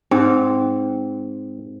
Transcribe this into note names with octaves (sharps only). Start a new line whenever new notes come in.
G#2 C4